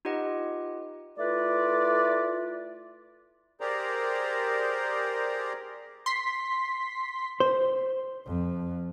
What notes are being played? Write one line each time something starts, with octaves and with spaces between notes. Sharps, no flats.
D#4 F4 G4 B4 D#5 F#5
A3 E4 F4 B4 D5
G4 G#4 A#4 C5 D5 A#5
C6 B6
C5
F2